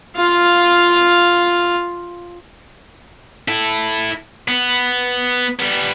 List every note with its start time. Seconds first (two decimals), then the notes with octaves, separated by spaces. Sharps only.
0.17 F4 F5
3.48 E4 A4
4.48 B3
5.60 G3 B3